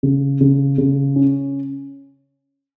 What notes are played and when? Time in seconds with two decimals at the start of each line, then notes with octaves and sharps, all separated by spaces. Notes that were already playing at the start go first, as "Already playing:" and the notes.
0.03 C#3
0.41 C#3
0.78 C#3
1.16 C#4